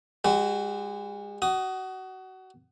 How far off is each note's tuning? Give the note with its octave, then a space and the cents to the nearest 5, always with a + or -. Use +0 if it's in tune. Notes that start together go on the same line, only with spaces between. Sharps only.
G#3 -35 F#4 +25
F#4 +25 D#6 +0